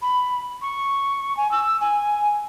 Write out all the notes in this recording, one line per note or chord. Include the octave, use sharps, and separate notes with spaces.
B5
C#6
G#5
E6
G#5